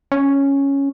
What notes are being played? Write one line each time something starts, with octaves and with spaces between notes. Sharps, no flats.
C#4